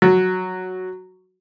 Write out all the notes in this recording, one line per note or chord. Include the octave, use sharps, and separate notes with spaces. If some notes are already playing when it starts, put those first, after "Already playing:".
F#3